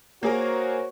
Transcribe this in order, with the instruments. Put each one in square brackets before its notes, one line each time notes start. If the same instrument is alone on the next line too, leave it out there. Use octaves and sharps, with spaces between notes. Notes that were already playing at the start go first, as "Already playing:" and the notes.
[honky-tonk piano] A#3 G#4 A#4 [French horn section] F#4 C5 C#5